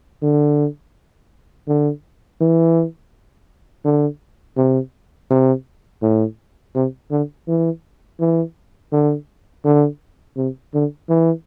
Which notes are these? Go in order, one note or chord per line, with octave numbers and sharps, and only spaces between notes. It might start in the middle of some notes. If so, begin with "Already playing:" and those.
D3
D3
E3
D3
C3
C3
A2
C3
D3
E3
E3
D3
D3
C3
D3
E3